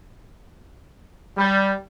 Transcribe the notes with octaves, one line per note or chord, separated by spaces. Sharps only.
G3